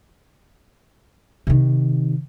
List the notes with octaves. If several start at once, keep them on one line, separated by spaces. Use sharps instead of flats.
C3 D#3